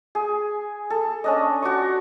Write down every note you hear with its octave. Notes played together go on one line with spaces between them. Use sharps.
G#4
A4
C#4 D4 D#5
F#4 D5 C#6